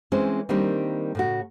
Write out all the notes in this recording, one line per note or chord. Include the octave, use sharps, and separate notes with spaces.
E3 G#3 C4 C#4 C5
D#3 G3 A#3 C4 D4
A2 C#3 F#4